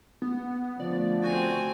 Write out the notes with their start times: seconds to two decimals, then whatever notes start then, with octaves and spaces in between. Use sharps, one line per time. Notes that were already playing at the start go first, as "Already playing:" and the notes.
0.22 B3
0.80 D3 F3 A3 B3 D5
1.23 C4 F#4 G#5